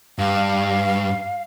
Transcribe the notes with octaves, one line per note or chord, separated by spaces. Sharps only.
G2 F5